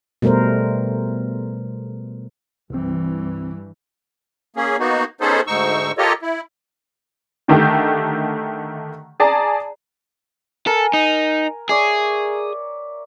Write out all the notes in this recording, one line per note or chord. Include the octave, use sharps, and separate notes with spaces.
B2 G3 A3 A#4 C5
C2 G2 E3 C4
A#3 C#4 G#4
A#3 B3 D#4 F#4
B3 C#4 D#4 G#4 A4 C5
D2 G#2 D#4 C#6 E6
F4 G4 A4 A#4 C#5 D#5
E4
D3 D#3 A3 G4
G#4 D5 A5 A#5
A4 A#4 G#5
D#4
G#4 C#5 D5 E5